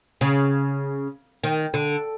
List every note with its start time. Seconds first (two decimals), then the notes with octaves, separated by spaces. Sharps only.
0.21 C#3
1.44 D#3
1.74 D3